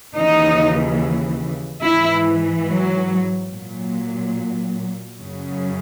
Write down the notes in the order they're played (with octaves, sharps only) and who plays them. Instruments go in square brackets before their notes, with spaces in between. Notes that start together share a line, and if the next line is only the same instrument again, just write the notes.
[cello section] D#2 C#3 E3 D#4
G#2 E3 E4
F#3
A#2 F#3
F#2 C#3 F#3